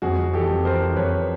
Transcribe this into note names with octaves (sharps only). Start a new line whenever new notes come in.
F2 F#4 G#4
F2
E3 G4 A4
F2
E3 A#4 C5
E3
F2 B4 C#5